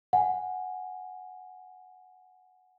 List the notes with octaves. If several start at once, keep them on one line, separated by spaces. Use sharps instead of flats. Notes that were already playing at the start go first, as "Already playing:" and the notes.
F#5 G#5